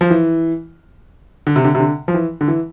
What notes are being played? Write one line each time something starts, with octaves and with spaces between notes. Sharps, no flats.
F3
E3
D3
C3
D3
C3
D3
F3
E3
D3
E3